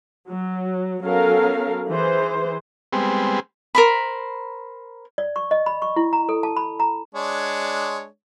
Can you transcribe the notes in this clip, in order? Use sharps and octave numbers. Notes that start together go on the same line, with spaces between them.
F#3
F#3 B3 C#4 A4 A#4 F5
E3 G#4 C5
G3 G#3 B3 C4
A#4 C5 B5
D5
C#6
D#5
B5
C#6
E4
A#5
A4
A5
B5
A#5
G#3 D4 C#5